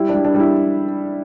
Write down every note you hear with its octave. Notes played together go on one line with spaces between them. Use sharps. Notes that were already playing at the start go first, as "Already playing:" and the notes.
Already playing: G3 E4
D4
G3
D4
G3
E4